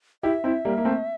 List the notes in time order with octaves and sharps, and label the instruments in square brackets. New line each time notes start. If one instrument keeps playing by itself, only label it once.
[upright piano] E4 G4 [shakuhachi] E5
[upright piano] C4 E4
G3 A#3
A#3
A3 C4